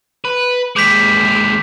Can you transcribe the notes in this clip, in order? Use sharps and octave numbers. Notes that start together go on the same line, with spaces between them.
B4
D#2 G#3 D6 G6 B6